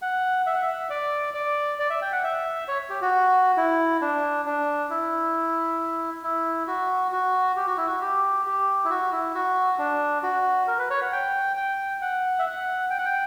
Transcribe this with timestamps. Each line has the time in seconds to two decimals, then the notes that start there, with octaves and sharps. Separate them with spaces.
0.02 F#5
0.46 E5
0.54 F#5
0.62 E5
0.90 D5
1.34 D5
1.79 D5
1.90 E5
2.02 G5
2.12 F#5
2.24 E5
2.68 C#5
2.90 G4
3.02 F#4
3.57 E4
4.01 D4
4.46 D4
4.90 E4
6.23 E4
6.67 F#4
7.12 F#4
7.56 G4
7.67 F#4
7.77 E4
7.87 F#4
8.01 G4
8.46 G4
8.85 E4
8.90 F#4
9.12 E4
9.35 F#4
9.78 D4
10.23 F#4
10.67 A#4
10.79 B4
10.90 C#5
11.01 F#5
11.12 G5
11.57 G5
12.02 F#5
12.39 E5
12.46 F#5
12.90 G5
12.98 F#5
13.05 G5